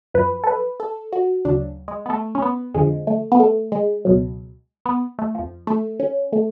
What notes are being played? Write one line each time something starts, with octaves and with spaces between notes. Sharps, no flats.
F#2 F3 B4
A4
B4
A4
F#4
D2 C#3 F#3 D4
G#3
B3
A3
C#4
B3
F2 D3 F3 G#3
A3
B3
A3
G#3
C#2 B2 F#3
B3
A3
F2 F3
A3
C#4
A3